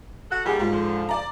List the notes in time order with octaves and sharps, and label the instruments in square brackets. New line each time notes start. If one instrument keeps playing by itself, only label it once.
[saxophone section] F#4 A4 F#5
[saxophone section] D#2 A2 G3 [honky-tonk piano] G#4 F#5
[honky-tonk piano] G#2 F4
[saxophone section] D3 F3
[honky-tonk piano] D5 A#5